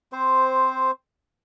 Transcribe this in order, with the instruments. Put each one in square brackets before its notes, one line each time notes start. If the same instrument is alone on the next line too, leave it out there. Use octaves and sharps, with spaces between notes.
[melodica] C4 C5